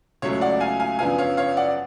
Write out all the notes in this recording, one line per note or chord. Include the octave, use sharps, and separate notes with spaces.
C#2 C#3 F#3 A3 C#5
D5 F#5
F5 G#5
F5 G#5
F#2 C#3 F3 B3 D4 F5 G#5
C#5 F5
C#5 F5
D5 F#5